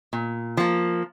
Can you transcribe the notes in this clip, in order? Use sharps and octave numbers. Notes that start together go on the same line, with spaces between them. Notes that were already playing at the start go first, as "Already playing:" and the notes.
A#2
F3 A#3